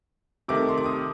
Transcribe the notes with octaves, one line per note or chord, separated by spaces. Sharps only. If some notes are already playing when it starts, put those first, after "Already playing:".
C3 D#3 A3 D6
C6
D6
D#6